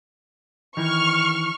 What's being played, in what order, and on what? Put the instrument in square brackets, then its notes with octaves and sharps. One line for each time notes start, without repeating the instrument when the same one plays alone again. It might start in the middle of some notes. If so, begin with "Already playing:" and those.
[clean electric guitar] D#3 E3 [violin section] C#6 F6